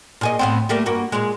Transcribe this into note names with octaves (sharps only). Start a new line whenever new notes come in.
A#2 G#4 D#5
A2 B3 C4
G3 A3 A#3
G2 A#3 F#4
A#2 G#3